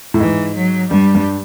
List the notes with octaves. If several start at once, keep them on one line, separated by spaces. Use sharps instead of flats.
A2
G#2 E3
F#3
G2 G3
G2